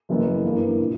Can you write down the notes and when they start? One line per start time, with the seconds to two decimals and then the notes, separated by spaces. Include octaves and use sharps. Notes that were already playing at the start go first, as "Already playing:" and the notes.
0.09 F#1 F#2 E3 B3
0.44 G2 E3 A#3 E4
0.82 A#2